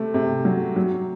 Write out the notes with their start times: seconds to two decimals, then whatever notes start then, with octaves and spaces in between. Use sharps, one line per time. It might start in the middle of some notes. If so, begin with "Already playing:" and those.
Already playing: C3 A3
0.14 C3
0.45 F#3
0.76 F#3